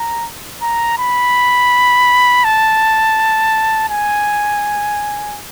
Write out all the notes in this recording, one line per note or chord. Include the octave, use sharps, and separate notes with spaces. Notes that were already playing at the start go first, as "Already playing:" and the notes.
Already playing: A#5
A#5
B5
A5
G#5